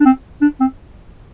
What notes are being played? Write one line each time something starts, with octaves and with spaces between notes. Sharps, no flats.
D4
C4
D4
C4